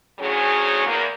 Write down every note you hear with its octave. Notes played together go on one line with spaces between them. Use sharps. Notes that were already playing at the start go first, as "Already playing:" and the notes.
D2 A2 F#3 C#4 G#4
E2 A#3